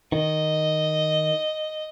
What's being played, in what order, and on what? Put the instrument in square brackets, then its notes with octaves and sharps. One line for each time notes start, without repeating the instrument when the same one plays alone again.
[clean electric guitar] D#3 [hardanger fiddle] D#5